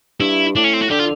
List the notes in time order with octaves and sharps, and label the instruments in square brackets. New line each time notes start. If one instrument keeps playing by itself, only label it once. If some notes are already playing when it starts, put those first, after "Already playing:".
[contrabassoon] G2 [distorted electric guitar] E4
[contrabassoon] A2 [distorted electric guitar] D4
[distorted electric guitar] C#4
C4
F#4
[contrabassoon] D3 [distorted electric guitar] G4
[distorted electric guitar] F4